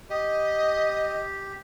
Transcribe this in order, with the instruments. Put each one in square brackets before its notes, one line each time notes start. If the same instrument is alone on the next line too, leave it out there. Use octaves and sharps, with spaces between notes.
[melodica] G4 [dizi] D#5